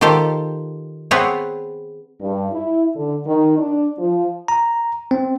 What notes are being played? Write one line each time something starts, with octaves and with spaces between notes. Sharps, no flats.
D#3 F4 G4 A4 C5
B3 C4 G#4 B4 C#5
G2
E4
D3
D#3
D4
F3
A#5
C4